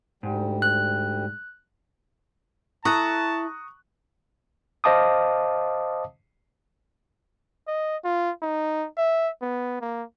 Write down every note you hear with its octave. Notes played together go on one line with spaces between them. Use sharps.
D2 G#2 G3
F#6
E4 A4 A5 A#5 C#6 D#6 F#6
C5 D#5 F5 A5 D6 D#6
D#5
F4
D#4
E5
B3
A#3